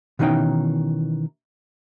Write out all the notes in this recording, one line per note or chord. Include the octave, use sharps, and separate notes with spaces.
B2 D#3 E3 C#4 D#4 G5